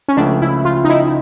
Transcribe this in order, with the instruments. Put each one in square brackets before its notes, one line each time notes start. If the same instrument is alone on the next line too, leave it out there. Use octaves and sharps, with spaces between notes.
[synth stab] C#4
[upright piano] C#2 C#3 F3 A3 [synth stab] D4
[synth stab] E4
F4
D#4
E4